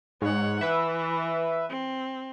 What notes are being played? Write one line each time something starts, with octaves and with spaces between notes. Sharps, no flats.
G#2 C#5 F#5
E3 B4 E5
C4